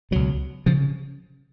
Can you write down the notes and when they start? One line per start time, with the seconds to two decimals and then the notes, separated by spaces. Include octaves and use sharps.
0.11 C#2 B2 F#3
0.66 C#3 F3